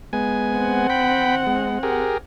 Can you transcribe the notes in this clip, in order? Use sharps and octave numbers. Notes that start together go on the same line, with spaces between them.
G#3 B3 G#5
C4 F#5
G5 B5
G#3
G4 G#4 A#4